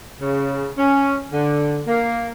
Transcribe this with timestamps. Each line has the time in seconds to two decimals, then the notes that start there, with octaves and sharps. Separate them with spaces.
0.20 C#3
0.77 C#4
1.31 D3
1.86 A#3